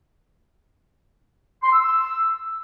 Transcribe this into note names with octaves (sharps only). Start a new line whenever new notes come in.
C6
E6
E6